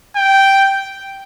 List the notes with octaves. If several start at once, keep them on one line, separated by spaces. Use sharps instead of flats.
G5